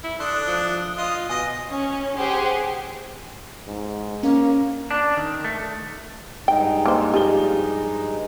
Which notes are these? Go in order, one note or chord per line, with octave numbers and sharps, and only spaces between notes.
E4
D4 A4 C6 D#6 F#6
F3 G7
F4 D#5
B2 D#5 G#5 D#6 A#6
C#4
G4 G#4 C5 F#5 G#5
G#2
A#3 C#4
D4
D#3
A3
G2 G#3 D#4 G5
A#3 C5
F3 G4 G7